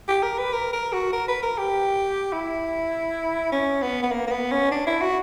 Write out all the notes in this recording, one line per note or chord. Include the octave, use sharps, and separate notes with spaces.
G4
A#4
B4
A#4
A#4
F#4
A#4
B4
A#4
G4
E4
C#4
B3
B3
A#3
A#3
B3
C#4
D4
E4
F#4